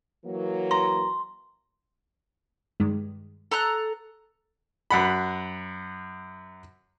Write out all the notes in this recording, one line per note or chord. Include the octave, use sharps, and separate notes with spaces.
E3 F#3 A#3
A#5 C6
G2 D#3 G#3
A4 A#5 F#6
F#2 F#5 B5